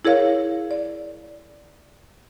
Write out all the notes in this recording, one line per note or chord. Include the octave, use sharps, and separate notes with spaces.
E4 G#4 A#4 C#5 F5
D5